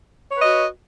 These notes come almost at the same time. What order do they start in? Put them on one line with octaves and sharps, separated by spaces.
C#5 B4 D#5 F#4